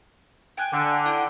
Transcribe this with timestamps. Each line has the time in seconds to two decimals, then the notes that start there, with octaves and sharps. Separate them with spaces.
0.57 G5 G#5 F#6
0.72 D3
1.05 E4 F#5 G5